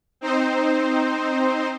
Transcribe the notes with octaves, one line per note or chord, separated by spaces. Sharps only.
C4 D#4 C5